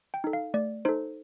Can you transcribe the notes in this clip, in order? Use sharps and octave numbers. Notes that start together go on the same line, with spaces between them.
G5
D#4 A4
F5
A3 D5
D#4 A4 C5